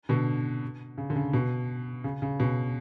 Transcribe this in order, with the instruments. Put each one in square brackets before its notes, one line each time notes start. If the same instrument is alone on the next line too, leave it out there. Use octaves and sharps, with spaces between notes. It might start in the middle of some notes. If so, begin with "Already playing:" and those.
[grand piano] B2 D3
C#3
D3
C#3
B2
C#3
C#3
B2